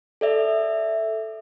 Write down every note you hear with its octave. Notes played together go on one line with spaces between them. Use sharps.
A4 D5 E5